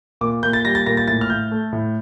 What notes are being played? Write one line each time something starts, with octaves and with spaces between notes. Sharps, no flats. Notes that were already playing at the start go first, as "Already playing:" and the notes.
A#2 D6
A#2 G6
A6
G3 A#6
A6
A#2 A#6
A6
A2 A6
F6
A2 G6
A3
A2